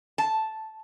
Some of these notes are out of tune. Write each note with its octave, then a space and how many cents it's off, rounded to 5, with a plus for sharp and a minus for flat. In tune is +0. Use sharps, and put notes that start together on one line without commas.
A5 -5